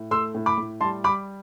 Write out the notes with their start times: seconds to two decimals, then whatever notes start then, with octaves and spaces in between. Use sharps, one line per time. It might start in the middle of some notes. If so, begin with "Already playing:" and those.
Already playing: A2
0.11 A3 C6 E6
0.35 A2
0.46 B5 D6
0.58 A2
0.81 G3 A5 C6
1.04 G3 B5 D6